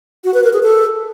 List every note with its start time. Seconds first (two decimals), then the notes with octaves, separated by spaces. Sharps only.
0.24 F#4
0.34 B4
0.44 A#4
0.53 G#4
0.63 A4